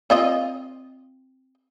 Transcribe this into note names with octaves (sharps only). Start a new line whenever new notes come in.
C4 F4 D#5